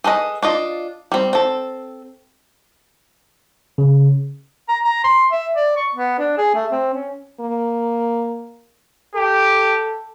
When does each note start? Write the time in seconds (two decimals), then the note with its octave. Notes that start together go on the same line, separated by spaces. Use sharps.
0.04 G#4 A4 B4 D#5
0.43 D4 F4 D#5
1.12 G3 C4
1.33 C4 A4
3.78 C#3
4.69 A#5
4.84 A#5
5.04 C6
5.32 E5
5.55 D5
5.77 C#6
5.95 B3
6.18 D4
6.38 G#4
6.55 A3
6.72 C4
6.94 C#4
7.40 A#3
9.16 G4 A4